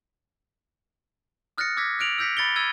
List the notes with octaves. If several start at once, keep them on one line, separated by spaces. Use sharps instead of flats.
D#6 F6 F#6 A6 A#6 C#7
D6 E6 G#6 A#6 B6 C#7
F6 F#6 D7 F7 F#7
E6 F6 G6 A#6 B6 C#7
B5 A6 C#7 G7
E6 G#6 D#7 F7